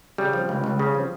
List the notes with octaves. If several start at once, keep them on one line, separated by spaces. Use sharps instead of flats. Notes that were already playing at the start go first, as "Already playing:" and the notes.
C#3 G3
F3
C#2
C#2
C#3
F3